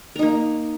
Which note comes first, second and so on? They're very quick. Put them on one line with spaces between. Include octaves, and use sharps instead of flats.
A#4 D#4 A#3